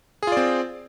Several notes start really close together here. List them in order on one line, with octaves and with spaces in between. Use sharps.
G#4 F4 D5 C4